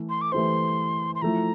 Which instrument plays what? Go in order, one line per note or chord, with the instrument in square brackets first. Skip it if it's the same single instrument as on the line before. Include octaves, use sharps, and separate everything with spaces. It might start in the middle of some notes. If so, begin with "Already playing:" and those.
Already playing: [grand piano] E3 A3 E4
[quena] C6
D6
[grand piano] E3 A3 E4 G4 C5 [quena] C6
[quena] C6
[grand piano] F3 A3 E4 [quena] A#5